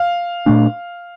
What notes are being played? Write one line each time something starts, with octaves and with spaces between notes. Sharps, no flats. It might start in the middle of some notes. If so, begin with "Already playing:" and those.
Already playing: F5
A#2 A3 D4